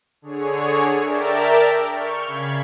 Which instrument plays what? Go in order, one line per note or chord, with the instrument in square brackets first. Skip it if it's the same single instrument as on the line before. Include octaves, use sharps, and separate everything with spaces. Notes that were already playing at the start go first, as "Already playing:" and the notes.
[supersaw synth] D3 G#4 C#5
A#4 D5 E5 G5 A5 A#5
C#6 F6 G6
C#3 F5 B5 G#6